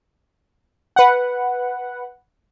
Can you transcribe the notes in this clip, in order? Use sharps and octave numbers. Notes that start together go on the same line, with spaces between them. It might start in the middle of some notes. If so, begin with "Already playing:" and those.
B4 F#5